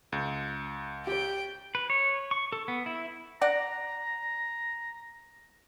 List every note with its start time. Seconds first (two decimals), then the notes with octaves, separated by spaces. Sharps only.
0.12 C#2
1.07 G4 D5 G5
1.75 B4
1.90 C#5
2.31 C#6
2.53 A4
2.68 B3
2.86 E4
3.41 D5 F#5 A#5